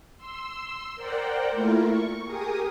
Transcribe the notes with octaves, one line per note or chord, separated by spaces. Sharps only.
C6 E6
A#4 C5 D5 F#5 G5
A3 A#3 E4 F4 A#4
C#6
G4 G#4 A#4 D#6